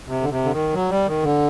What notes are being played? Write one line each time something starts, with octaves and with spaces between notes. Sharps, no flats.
C3
D3
C3
D3
D#3
F#3
G3
D#3
D3